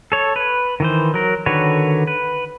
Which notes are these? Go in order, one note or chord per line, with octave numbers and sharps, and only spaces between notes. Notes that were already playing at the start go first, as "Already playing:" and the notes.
A4 C#5
B4
D#3 E3 C5
F#3 A#4
D3 D#3 F#4 B4 C#5
B4